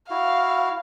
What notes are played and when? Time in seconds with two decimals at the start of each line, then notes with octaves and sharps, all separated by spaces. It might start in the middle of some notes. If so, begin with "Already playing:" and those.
0.10 E4 F#4 F5